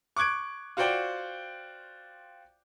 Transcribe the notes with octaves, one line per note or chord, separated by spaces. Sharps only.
C#6 D6 F#6 G#6 D7
F4 F#4 C5 D5 G5